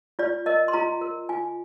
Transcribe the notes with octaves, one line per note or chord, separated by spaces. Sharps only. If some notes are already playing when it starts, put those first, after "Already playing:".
F4 D5
A#4 D#5
C6
F4 A#5
A#4
F4 G#5